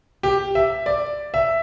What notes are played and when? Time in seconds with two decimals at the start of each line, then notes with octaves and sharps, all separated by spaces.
0.23 G4
0.55 E5
0.86 D5
1.34 E5